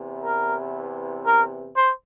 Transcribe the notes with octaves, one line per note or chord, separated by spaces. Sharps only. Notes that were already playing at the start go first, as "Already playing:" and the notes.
Already playing: E2 C3 E3
A#4
A#4
C5